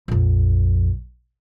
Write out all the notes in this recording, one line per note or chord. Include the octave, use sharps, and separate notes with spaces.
A#1 F2